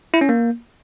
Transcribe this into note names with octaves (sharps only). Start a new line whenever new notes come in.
E4
C#4
A#3